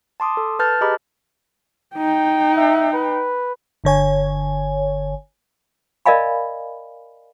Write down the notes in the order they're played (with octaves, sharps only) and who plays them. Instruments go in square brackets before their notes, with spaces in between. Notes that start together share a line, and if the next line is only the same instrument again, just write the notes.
[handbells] A5 C6 D6 D#6
A4
B4 A5 F6 G6 A6
G4 G#4 D#5 A#5 B5 D6
[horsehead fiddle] D#4 G5
[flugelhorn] E5
B4
[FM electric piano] G1 D3 C#5 G#5
[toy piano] A#4 D5 D#5 F5 G#5 B5